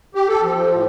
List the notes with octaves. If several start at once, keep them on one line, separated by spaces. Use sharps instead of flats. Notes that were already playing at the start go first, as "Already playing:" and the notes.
G4
A4
F3
F3
A2